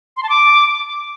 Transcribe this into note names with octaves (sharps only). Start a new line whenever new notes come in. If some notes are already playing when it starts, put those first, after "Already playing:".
C6
A5
D6